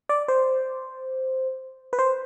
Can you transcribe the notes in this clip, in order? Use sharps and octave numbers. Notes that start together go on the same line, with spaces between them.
D5
C5
B4
C5